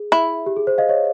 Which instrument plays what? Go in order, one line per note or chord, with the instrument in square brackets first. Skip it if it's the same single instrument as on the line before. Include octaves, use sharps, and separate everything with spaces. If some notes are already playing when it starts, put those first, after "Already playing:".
Already playing: [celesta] G#4
[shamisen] E4
[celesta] G4
G#4
C5
D#5 F5
C#5 D#5